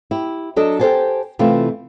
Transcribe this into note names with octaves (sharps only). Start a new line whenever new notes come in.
E4 G4
F#3 D4 A4 D#5
G4 A4 B4 C5 G#5 A5
C3 E3 A3 F4